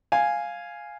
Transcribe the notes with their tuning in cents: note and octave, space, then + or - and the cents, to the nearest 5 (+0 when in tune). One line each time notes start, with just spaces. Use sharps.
F5 +0 G#5 +0